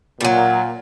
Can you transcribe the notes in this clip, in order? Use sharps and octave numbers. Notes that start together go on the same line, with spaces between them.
A#2 F#3 G3